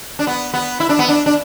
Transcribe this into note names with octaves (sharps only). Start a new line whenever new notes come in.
D4
B3
B3
E4
D4
B3
D4
D4